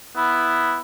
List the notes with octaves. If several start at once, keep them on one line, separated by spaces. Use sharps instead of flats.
B3 E4